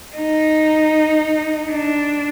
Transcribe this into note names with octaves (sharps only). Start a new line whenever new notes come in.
D#4
D4